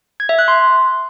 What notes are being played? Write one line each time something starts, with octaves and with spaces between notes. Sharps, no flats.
G#6
E5
F#6
C6